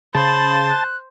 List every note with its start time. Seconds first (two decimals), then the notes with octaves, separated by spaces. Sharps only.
0.15 C#3 C5 A5 B5
0.69 F#6